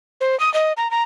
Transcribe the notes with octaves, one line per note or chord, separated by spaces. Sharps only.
C5
D#6
D#5
A#5
A#5